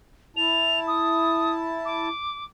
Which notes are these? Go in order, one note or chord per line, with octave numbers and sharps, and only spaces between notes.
E4 A5 F7
D#6
D6